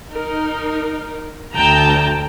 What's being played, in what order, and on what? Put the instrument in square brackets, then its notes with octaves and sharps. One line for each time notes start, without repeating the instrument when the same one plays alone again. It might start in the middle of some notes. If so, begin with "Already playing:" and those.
[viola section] D#4 A#4
[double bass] D2 [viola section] G5 A5 A#5